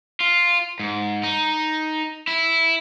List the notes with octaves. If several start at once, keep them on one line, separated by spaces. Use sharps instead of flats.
F4
G#2
D#4
E4